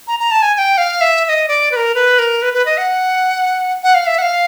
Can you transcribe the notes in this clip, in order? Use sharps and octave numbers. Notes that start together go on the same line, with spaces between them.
A#5
A#5
A5
G#5
G#5
G5
F5
E5
E5
D#5
D5
B4
A#4
B4
A#4
B4
B4
D#5
F#5
F#5
F5
E5
F#5
F5